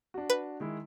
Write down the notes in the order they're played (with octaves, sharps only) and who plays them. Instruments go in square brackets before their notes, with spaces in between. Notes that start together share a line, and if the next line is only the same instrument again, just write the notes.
[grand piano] D4 F#4
[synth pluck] B4
[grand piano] D#3 G#3 E4